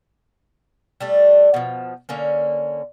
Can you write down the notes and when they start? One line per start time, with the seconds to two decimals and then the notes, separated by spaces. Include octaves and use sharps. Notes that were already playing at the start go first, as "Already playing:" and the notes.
1.01 G3 A3 D4
1.54 B2 F3
2.09 D3 A#3 C#4